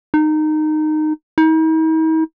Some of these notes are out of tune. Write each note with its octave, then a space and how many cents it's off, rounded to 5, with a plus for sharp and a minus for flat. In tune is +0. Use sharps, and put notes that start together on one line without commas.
D#4 -15
D#4 +45